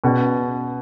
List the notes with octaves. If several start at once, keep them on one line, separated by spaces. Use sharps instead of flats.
B2 C#4 G#4 B4 D5